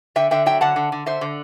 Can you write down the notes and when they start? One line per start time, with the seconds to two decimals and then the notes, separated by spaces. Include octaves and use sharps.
0.16 D3 E5 G5
0.31 D3 E5 G5
0.46 F#3 E5 G5
0.61 D3 F#5 A5
0.76 D3
0.92 D3
1.06 D3 C5 E5
1.21 D3